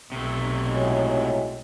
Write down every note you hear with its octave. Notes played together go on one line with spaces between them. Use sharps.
B1 C3 A3
A2 F#3 G#3